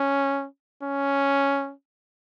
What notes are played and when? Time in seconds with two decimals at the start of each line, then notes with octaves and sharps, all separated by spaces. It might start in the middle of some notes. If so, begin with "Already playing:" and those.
Already playing: C#4
0.83 C#4